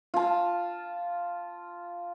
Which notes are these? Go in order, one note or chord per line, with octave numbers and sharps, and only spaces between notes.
F4 A5